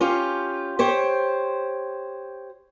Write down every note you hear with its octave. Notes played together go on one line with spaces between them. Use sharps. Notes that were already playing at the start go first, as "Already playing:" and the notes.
C#4 F4 G4
G4 C5 C#5